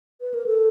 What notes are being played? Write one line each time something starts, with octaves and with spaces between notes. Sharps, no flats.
B4
A#4
A4